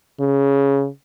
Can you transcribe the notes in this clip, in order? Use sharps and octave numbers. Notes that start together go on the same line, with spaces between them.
C#3